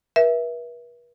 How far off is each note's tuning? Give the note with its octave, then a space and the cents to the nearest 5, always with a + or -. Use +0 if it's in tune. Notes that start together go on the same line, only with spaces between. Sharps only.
B4 -45 E5 +0